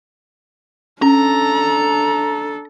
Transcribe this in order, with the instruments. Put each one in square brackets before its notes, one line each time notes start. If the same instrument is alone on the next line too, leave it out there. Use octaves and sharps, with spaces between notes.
[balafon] C#4 [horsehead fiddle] D4 A4 [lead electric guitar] A#5